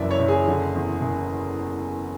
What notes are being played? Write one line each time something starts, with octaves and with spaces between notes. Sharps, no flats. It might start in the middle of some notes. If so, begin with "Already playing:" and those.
Already playing: F#1 F#2 E3 B4 D5 E5
C#5
F#1
G#4
D3
E2
F#1